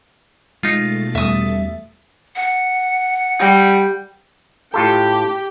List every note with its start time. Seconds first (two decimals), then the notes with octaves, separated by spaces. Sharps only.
0.63 B2 G#3 A3 D#4 F4 A6
1.15 E2 G3 E5 D#6
2.36 F#5
3.40 G3
4.74 A2 F4 G4 A4 G5